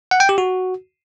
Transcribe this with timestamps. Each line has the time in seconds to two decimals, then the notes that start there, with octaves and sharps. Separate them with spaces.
0.11 F#5
0.20 G5
0.29 G4
0.38 F#4